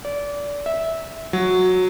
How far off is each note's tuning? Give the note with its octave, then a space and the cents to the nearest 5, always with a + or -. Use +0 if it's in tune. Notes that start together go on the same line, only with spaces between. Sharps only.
D5 -25
E5 -15
F#3 -10